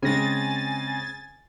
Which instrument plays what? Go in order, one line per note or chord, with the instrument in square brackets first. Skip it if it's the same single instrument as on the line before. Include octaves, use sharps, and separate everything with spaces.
[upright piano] C#3 G#3 [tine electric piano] C4 A#6 [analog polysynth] G#5 A6